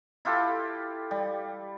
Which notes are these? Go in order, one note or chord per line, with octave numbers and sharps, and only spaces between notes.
E4 F4 G4 A4
G3